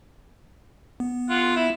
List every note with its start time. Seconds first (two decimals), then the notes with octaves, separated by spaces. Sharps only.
1.00 B3
1.30 F4 F#5
1.56 E4